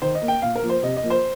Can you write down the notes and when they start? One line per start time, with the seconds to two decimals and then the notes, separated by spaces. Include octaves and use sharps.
0.02 D#3 C5
0.15 D#5
0.22 A#3
0.28 G5
0.42 A#2 F5
0.55 A#4
0.63 F3 A#3
0.69 C5
0.83 C3 D#5
0.97 D#5
1.03 F3 A#3
1.10 C5